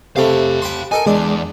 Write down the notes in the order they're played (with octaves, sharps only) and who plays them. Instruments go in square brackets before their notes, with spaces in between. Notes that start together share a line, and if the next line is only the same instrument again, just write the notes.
[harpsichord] C3 A3 [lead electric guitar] G4 F5
[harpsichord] G5 B5 C6
[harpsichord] D#4 A4 A#4 [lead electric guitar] G#5
[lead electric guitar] E2 [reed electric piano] G#3 [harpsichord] D4